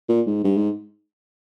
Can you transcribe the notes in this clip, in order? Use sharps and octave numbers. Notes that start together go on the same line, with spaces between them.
A#2
G#2
G2
G#2